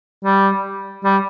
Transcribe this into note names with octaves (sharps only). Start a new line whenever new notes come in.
G3
G3